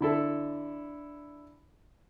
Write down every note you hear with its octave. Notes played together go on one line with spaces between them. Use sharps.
D3 E4 A4